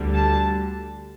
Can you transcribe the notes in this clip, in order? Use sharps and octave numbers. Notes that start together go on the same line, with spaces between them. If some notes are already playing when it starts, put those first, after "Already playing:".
Already playing: D2 D3 G3
A5